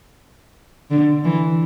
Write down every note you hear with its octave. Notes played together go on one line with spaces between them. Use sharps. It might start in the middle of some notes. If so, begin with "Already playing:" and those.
D3
E3